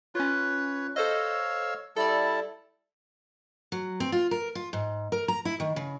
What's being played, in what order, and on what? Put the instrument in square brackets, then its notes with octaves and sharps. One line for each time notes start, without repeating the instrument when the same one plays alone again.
[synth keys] C#4 F4 [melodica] B4 C#5
[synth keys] A4 C5 D#5 [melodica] C#5 F5 E6
[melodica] G3 E4 A5 [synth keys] A4 D5
[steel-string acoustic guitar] F#3
C4
F4
A#4
F4
G#2
A#4
A#5
E4
D#3
C#3